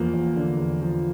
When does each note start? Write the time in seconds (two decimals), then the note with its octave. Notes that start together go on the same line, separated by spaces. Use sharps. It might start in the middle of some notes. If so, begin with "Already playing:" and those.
Already playing: E2 F3 A#3
0.14 E2
0.36 D3
0.59 E2
0.82 F3